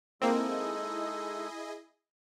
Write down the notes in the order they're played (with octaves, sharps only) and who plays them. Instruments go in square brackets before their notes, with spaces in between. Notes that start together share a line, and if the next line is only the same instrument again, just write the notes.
[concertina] G#3 D#4 A4 [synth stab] A#3 C4 [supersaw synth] E4 G#4 D#5